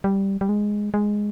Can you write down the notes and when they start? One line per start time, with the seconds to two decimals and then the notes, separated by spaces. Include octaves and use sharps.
0.04 G3
0.41 G3
0.49 G#3
0.94 G#3